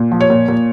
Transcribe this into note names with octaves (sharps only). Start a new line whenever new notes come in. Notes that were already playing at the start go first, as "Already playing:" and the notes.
Already playing: A#2
F3
C#5
A#2
A#2